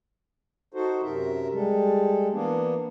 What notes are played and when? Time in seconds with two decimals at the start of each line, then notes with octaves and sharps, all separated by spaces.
0.74 D#4 F#4 A4 C5
1.03 F#2 C3 A#4 E5
1.53 G3 G#3 A4
2.33 E3 A#3 B3 D4